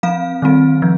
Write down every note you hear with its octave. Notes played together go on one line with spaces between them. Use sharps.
F3 C4 F5
D#3 G3 C4
F3